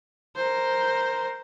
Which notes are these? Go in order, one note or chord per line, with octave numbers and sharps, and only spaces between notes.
A#4 C5